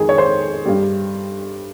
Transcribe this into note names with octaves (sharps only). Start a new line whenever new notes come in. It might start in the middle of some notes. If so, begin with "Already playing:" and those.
Already playing: F2 D#3 G#3 G#4
C#5
C5
G2 G3